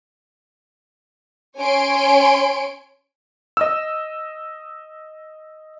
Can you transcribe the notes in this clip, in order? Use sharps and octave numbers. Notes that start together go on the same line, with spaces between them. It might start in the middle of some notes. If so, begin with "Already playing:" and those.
C#4 C#5 G#5 C6 D7
D#5 E6